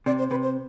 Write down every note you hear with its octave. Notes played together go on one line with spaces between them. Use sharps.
C3 D5
C5
C3 B4
C5